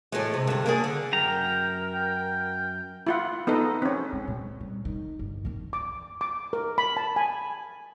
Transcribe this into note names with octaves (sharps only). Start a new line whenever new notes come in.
A2 E3 G#3
C3
G2 D3
A#3 D4 G#4
D3
F#2 A#4 G5 A#5
G5
E4 F4 F#5
B3 D#4 A4 D#5
C4 C#4
G#3
A#2
G3
D#3
G1
D#3 C4
D6
D6
A#4
B5
A5
G#5